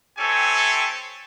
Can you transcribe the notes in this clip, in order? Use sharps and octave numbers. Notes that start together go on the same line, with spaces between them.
C4 E4 G4 A4 C#5 G#5